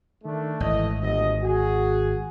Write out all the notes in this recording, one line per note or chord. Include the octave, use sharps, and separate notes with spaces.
D#3 A3 D4
G#1 E3 A3 D#5
G1 D2 D#5
F#4 G#4